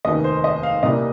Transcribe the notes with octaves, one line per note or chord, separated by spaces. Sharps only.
F1 D#2 D#3 D#5
C5
D#5
F5
C2 A#2 G3 A#3 D#5